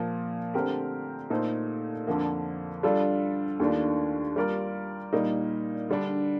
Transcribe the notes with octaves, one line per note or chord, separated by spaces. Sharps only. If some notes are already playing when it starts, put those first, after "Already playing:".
Already playing: A#2 F3 A#3
D3 A3 C4 G4 A#4
A#2 A3 D#4 A4 C5
F2 D3 F3 A#3
G3 D4 F4 A4
D#2 D#3 A3 D4 F4
G3 A#3 F4 A#4 D5
A#2 G3 A#3 D#4
D3 G3 D4